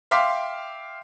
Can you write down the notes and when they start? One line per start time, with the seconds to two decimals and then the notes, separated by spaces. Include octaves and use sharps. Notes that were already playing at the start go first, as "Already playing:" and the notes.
0.11 E5 F5 G5 C6 D6 B6